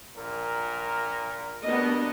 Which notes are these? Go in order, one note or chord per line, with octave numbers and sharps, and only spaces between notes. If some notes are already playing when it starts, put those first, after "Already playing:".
A#1 A#2 A#4
B2 G3 B3 D4 A#4 D#5